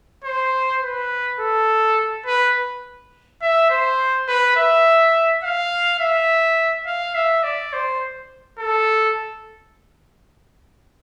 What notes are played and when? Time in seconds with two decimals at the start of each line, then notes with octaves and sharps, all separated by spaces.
0.24 C5
0.83 B4
1.40 A4
2.26 B4
3.42 E5
3.70 C5
4.28 B4
4.56 E5
5.43 F5
5.99 E5
6.86 F5
7.15 E5
7.43 D5
7.73 C5
8.59 A4